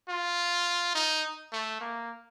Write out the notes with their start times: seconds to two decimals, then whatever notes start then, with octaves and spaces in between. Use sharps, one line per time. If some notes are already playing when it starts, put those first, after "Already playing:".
0.08 F4
0.95 D#4
1.53 A3
1.81 A#3